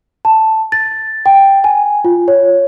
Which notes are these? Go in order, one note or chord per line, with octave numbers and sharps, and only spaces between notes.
A5
A6
G5
G#5
F4
C#5